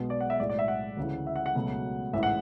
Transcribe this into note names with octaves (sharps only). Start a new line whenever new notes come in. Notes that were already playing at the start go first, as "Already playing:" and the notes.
Already playing: B1 B2 G#3 B3
D5
F#5
E5
B1 A2 G#3 D5
D5
E5
F#5
D2 C#3 E3
E5
F#5
F#5
C#2 B2 F#3 A3
A1 G#2 E3 E5
F#5